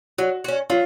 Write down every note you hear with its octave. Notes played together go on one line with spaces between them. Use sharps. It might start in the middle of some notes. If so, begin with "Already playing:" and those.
F#3 F#4
C#4 F#4
F#3 F4